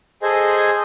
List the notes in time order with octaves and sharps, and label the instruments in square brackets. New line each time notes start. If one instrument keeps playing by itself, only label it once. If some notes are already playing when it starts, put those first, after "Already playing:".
[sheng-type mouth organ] G#4 A4 C5 D#5 G#5